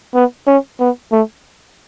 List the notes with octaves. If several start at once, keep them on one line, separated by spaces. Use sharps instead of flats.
B3
C#4
B3
A3